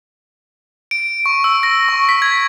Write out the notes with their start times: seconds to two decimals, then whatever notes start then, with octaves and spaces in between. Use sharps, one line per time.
0.91 D7
1.26 C#6
1.44 E6
1.63 A#6
1.89 C#6
2.09 B6
2.22 G#6